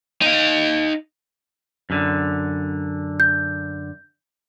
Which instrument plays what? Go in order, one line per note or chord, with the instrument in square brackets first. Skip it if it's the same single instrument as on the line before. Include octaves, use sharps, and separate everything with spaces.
[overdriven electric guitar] D#4 F5
[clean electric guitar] F#2 D3
[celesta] G6